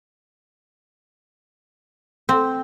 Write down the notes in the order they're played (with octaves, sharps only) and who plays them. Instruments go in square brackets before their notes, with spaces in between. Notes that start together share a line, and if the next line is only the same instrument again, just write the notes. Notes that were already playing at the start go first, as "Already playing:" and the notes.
[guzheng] C4